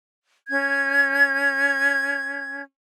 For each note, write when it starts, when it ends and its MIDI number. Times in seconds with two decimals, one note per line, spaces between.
0.48 2.61 61
0.48 2.61 92